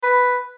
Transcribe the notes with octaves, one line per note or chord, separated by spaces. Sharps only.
B4